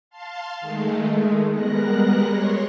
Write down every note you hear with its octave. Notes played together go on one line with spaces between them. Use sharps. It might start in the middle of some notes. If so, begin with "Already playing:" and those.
F5 A5 C6
D#3 G#3 A3
G3 G#3 B3 A#4 F#6 A#6
C#5 C6